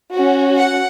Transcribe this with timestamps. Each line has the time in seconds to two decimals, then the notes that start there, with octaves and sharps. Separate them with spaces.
0.13 C#4 F#4
0.57 F#5